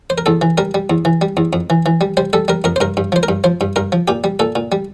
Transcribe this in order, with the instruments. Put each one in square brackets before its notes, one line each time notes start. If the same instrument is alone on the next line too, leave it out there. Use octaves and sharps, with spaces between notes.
[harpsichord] C5
A#4
E2 A4
E3
G3 A#4
G3
E2
E3
G3
E2
F2
E3
E3
G3
G3 C5
G3 A4
G3 A#4
F2 A#4
C5
G2 A#4
G2
F3 C5
A#4
G2
F3 C5
G2
G2 A#4
F3
A#2 G4
G3
A#2 A4
A#2
G3